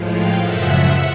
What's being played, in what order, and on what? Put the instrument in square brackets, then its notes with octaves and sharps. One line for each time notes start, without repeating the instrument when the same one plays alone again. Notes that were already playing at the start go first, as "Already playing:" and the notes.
Already playing: [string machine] A2 F3 G#3
F5 G5
F#2 C#3 F3 G#3 E5 F#5